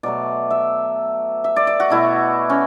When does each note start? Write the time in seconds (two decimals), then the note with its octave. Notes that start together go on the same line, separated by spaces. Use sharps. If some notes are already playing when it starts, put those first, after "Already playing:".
0.03 B2 F#3 A3 D5
0.50 E5
1.44 E5
1.56 D5
1.67 D5
1.80 F#4
1.90 B2 A3 E4
2.50 C#4